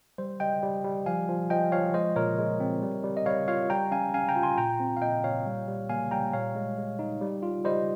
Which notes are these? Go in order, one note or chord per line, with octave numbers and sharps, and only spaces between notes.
G3 C5
G3 D#5 G5
G3
G3
F3 F5 G#5
F3
F3 D#5 G5
F3 C#5 F5
G#3 C5 D#5
A#2 A#4 C#5
G#3
C4
G3
G3
D#5
G3 C#5 F5
F4 C#5 F5
G3 G5 A#5
C#4 F5 G#5
C#4 F5 G#5
G5 A#5
F4
G#5 C6
A#2 G5 A#5
C4
F5
A#2 D#5 G5
A#2 C#5 F5
G3
G3
A#3 F5 G#5
G3 G5 A#5
A#2 C#5 F5
G#3
G#3
D#4
G3
F4
G3 C5 D#5